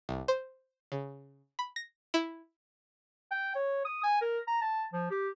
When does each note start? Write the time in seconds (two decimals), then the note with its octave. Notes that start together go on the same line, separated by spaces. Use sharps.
0.09 C2
0.28 C5
0.92 C#3
1.59 B5
1.76 A#6
2.14 E4
3.32 G5
3.56 C#5
3.85 D#6
4.04 G#5
4.21 A#4
4.48 A#5
4.62 A5
4.93 F3
5.11 G4